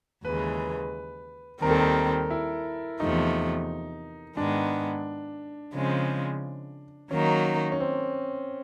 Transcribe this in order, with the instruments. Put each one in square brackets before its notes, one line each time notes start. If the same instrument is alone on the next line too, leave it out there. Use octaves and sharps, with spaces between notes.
[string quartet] D#2 C#3 E3 G#3 [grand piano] B4
[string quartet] D#2 D#3 G3 C4 [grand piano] A#4
[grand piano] A4
A#4
E4
[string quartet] E2 C3 F3 A3 [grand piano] D#4
[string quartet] G#2 D#3 G#3 B3 [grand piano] D4
[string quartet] C#3 F3 G#3 C4
[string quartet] D#3 F#3 A#3 D#4 [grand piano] C#4
[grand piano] C#4
C4